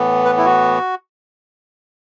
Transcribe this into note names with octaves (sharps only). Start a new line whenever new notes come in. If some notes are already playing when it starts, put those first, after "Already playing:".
Already playing: A2 E3 B3
B4
E4
F#4